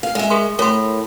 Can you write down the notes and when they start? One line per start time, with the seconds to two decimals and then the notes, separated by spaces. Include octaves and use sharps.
0.03 F5
0.15 G#3 E5
0.30 G#4 A#4 C6
0.59 A2 A#4 C6